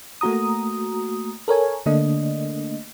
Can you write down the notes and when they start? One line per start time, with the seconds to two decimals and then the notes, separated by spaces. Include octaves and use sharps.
0.21 A3 A#3 F#4 A#5 D#6
1.48 A4 A#4 C#5 G#5
1.86 D3 A3 A#3 D4 D#5